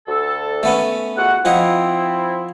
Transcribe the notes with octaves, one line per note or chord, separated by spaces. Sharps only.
D2 A4
A3 B3 C#4
C#2 F#4 F#5
F3 C4 E4 D#5 F#5